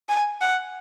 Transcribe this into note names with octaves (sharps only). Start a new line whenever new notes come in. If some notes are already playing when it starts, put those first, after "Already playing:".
G#5
F#5